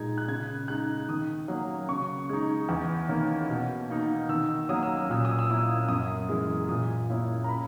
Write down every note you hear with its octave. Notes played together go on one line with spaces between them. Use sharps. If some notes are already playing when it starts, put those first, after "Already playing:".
Already playing: A#2 G#3 D#4 G#6
F#6
C#3 G#6
G#3 D#4 F#6
D#3 D#6
F#3 A#3 C#4
C#3 C#6
G#3 D#4
E2
D#3 A#3 C#4
B2
A#3 D#4
D#3 E6
F#3 A#3 C#4 D#6
E6
D#6
A#2 E6
D#6
E6
A#3 C#4 E4 D#6
F#2 D#6
E3 G#3
A#2 D#6
A#3 C#4 E4
A#5
B5